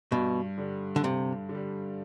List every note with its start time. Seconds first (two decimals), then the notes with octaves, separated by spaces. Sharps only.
0.11 G2 B2
0.58 D3 G3
0.96 D3
1.03 G2 C3
1.49 D3
1.55 G3